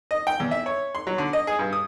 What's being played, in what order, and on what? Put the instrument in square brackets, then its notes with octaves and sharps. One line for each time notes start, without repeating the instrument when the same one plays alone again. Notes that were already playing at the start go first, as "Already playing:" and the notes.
[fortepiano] D#5
G5
E2
E5
C#5
C6
F#3
D3
D#5
G#4
G2
D#6